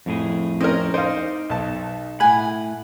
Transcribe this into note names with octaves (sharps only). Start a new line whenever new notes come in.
F2 A2 G#4
C4 C#4 A#4 D#5
D#4 C5 D5 F5
B1 A5
A2 F#5 G#5 B5